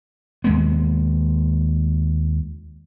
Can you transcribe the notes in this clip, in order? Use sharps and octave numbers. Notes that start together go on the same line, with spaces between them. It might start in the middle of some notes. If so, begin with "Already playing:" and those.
D#2 G#3 B3